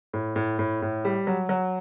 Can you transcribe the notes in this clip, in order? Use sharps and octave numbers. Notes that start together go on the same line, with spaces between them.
A2
A2
A2
A2
G3
F#3
F#3